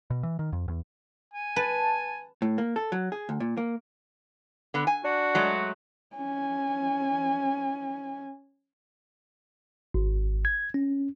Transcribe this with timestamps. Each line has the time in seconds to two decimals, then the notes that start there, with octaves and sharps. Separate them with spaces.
0.10 B2
0.23 E3
0.39 D#3
0.53 F2
0.68 E2
1.34 G#5
1.56 B4 A5
2.42 A2
2.58 A#3
2.76 A4
2.92 F#3
3.12 G#4
3.29 D2
3.40 A#2
3.57 A#3
4.74 D3 B3
4.87 G#5
5.05 D4 F#4
5.35 F#3 G#3 A3
6.16 C#4 G#5
9.94 G#1
10.45 G#6
10.74 C#4